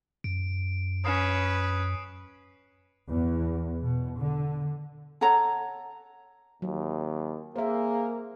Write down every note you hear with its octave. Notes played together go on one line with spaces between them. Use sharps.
F#2 D7
C#4 B4 D#6 C7 E7
E2
B2
D3
A4 C#5 F#5 A#5
D#2 F#3
A#3 G#4 C5 E5